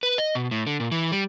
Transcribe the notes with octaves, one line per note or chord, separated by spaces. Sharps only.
B4
D#5
B2
A2
D3
A#2
E3
G3